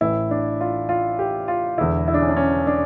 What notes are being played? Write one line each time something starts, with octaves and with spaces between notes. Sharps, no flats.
A1 A2 E3 E4
D4
F4
F4
G4
F4
E1 E2 D3 E4
E4
D4
C#4
D4
C#4
D4